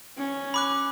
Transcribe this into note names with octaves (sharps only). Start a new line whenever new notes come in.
C#4
B5 D6 F#6